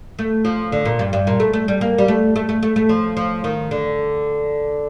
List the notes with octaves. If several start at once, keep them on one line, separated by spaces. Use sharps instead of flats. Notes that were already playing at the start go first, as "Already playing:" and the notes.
A3
F3
D3
A#2
G2
G2
A#2
A3
A3
G3
A#3
G3
A3
A3
A3
A3
A3
F3
F3
D#3
D3